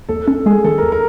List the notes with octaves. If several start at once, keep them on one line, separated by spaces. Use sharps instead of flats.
D#2 A4
C#4 A4
G#3 G#4
D#3 A4
D#2 A#4
A#4